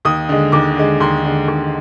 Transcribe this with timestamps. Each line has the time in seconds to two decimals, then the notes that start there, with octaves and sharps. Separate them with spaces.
0.05 D#2 D#6
0.29 D3 G#3
0.52 D#2 D6
0.77 D3 G#3
1.00 D#2 C6
1.25 D3 G#3
1.48 D#2